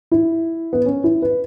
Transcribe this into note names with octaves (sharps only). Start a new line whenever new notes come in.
E4
B3
C#4
E4
B4